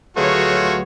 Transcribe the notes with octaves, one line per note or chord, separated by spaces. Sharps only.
D2 F#3 A3 F4 F#4 G#4 B4 C#5